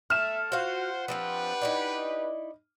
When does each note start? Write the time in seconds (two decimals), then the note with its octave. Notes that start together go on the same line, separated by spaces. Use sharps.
0.10 A3 E5 F6 E7
0.52 F4 F#4 C5 F5 F#5
1.08 F3 C4 D4 F4 G4 B4
1.61 D#4 E4 D5